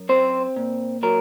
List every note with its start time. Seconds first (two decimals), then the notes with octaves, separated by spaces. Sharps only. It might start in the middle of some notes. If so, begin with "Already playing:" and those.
Already playing: F#2
0.09 C4 C5
0.56 A#2
1.03 F#3 A#4